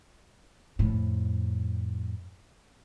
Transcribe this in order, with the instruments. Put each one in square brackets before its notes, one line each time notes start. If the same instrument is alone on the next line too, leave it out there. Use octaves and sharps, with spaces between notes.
[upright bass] F2 A2